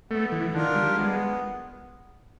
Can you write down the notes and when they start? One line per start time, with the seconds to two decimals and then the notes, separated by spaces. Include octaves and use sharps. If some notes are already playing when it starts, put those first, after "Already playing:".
0.11 A3 B3
0.32 E3
0.53 D#3 D4 F4 A#4
0.75 G3
0.96 G#3 B3